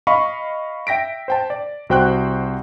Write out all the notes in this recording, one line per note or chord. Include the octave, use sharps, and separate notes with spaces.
D#5 F5 B5 C#6
E5 G5 A#6 B6 D7
C5 G5 A5
D5
C2 F#4 C5 G5 C6 F#6